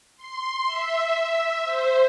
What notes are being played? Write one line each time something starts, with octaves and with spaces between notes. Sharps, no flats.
C6
E5
C5